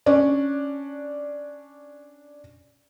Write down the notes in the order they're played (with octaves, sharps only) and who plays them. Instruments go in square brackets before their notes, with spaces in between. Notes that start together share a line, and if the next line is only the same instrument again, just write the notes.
[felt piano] C#4 D4